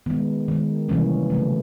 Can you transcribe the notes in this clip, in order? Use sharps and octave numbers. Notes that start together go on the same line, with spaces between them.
D#3 G#3 B3
D#3 G#3
C3 E3 G3 A#3 C#4
C#3 F#3 A3